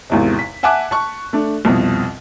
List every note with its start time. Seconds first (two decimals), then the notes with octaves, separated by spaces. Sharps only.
0.10 G#1 E2 C3
0.39 B6
0.63 E5 F#5 G#5 A5 D6 F#6
0.91 A5 C#6
1.33 A3 D4
1.65 C2 F2 B2